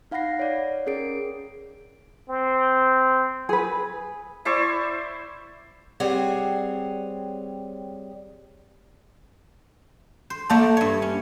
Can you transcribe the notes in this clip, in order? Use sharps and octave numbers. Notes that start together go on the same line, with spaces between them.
D#4 F5 F#5 B5 A#6 C7
C#5 D5
C#4 G#4 A#4 C7 D7
C4
G#4 B4
E4 C5 D5 C#6
G3 C4 G#4 C#5 F#5
C5
A3 A#3 D5 A5 A#5
G2 C#5
C#4